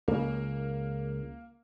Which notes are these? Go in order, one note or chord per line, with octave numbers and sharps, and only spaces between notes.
C#2 A#3